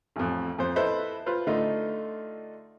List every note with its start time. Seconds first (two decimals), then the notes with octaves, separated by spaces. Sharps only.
0.16 A1 F2
0.59 F2 C5
0.76 E4 A4 B4 C5 D#5 E5
1.26 F4 B4 C5
1.47 D3 A3 D#4 F4